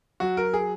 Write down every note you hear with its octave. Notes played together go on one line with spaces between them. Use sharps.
F#3 F#4
A#4
G#4